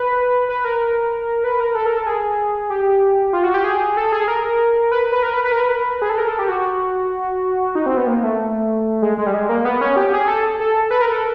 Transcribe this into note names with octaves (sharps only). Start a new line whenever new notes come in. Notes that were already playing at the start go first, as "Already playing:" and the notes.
Already playing: B4
B4
A#4
B4
A#4
A4
A#4
A4
G#4
G4
F4
F#4
G4
G#4
A4
G#4
A#4
B4
B4
A#4
B4
B4
A#4
B4
G#4
A4
A#4
A4
G4
F#4
D#4
C4
B3
A#3
A3
G#3
G#3
G3
G#3
A#3
B3
C#4
G4
G#4
A4
A4
B4
A#4
A4